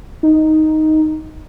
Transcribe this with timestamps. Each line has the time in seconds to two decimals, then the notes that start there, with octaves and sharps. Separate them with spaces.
0.23 D#4